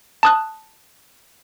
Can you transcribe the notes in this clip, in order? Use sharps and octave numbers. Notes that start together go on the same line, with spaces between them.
A5 D#6 F#6